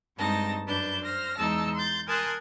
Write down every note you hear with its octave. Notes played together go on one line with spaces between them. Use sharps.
G2 G#3 C4 D#4 A5 A#6
F#2 D4 B4 A5 G6
C5 F6 A#6
E2 G#3 D#4 A5 E6
C6 G6 A6
A#4 G#5 A5 C6 D#6 F#6